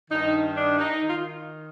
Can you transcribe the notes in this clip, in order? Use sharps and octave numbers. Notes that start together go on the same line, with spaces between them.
G2 D#3 D#4
D4
D#4
D#3 F4